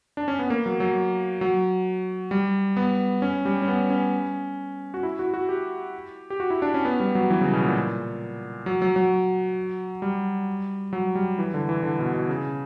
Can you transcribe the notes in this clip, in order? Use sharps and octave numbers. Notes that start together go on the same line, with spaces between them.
D4
C#4
B3
A#3
F#3
F#3
F#3
G3
B3
C#4
G3
C#4
B3
C#4
F#4
E4
F#4
F#4
G4
G4
F#4
E4
D4
C#4
B3
G3
F#3
E3
C#3
B2
A#2
F#3
F#3
F#3
G3
F#3
G3
E3
D3
E3
D3
B2
B2
C#3